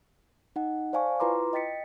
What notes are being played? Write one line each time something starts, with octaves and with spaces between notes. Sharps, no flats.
D#4 D#5 F#5
C5 D5 F5 G#5 A5 C#6
E4 F4 B4 A#5 C6 D6
D#5 G5 A6 B6 C#7